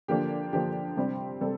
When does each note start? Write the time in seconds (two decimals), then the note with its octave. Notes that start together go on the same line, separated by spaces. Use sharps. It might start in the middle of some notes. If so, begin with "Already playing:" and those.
0.08 D3 F3 A#3 D4 G4
0.53 D3 F3 A#3 D4 G4
0.97 C3 G3 C4
1.41 C3 G3 C4 A4